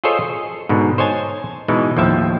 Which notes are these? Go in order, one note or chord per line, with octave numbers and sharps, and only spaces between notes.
F4 G#4 A4 C5 C#5 D#5
G#4
G#2 B2 D3
C5 C#5 D#5 G#5 A5
B2 E3 G#3 D#4
D#2 A2 F3 E5 A5